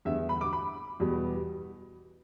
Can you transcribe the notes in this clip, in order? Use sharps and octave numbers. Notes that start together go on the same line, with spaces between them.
E2 D3 G3 E5
B5
D6
B5
E2 B2 G3